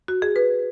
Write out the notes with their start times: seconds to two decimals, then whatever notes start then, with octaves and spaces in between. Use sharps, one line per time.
0.08 F#4
0.22 G#4
0.36 B4